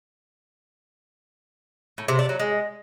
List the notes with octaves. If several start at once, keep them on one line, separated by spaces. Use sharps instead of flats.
A2
C3
D4
F#3
G#3